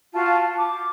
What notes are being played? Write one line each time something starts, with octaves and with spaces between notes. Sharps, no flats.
F4 F#4 F5 A5
A5
D6